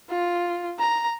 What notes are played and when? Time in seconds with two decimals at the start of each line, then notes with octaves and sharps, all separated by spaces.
0.10 F4
0.79 A#5